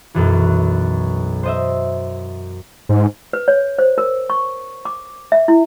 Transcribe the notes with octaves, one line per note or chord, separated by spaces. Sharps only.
B1 F#2 E3
C5 D#5 E5
G#2
B4
C#5
C5
A#4
C#6
D6
E5
E4